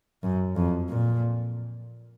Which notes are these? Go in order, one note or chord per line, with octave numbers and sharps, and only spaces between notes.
F#2
F2
A#2